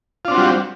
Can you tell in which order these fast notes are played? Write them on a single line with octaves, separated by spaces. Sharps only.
F4 D4 C4 F#4 G3